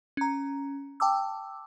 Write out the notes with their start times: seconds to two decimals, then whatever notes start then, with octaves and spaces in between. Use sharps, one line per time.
0.17 C#4 A#5
1.00 G5 A5 D6 E6